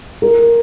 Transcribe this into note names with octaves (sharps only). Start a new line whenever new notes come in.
A#4